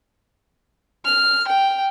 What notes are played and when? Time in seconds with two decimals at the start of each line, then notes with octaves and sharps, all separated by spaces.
1.05 F6
1.47 G5